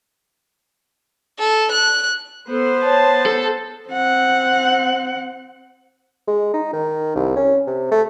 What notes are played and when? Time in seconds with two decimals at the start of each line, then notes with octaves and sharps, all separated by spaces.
1.39 A4
1.72 F#6
2.50 B3 A4 C5
2.84 C#5 A5
3.26 A4
3.89 C4 F#5
6.27 G#3
6.54 D#4
6.73 D#3
7.15 C2
7.36 C#4
7.67 C3
7.91 A3